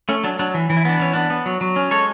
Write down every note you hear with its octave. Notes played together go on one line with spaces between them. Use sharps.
A3 C#4
F#3 D4
F#3 D4
E3
E3
E4
B3 D4
E3 C#4
B3 D4
B3
F#3
F#3
C#4
G#3 A4 C#5